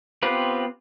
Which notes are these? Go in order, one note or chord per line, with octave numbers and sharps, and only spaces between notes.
B3 C4 F4 G4 B4